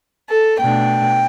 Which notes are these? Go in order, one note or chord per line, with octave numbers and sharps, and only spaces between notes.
A4
B2 A3 D4 G5